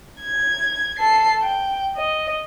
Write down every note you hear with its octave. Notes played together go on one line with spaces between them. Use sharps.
G#6
A4 C7
G5
D#5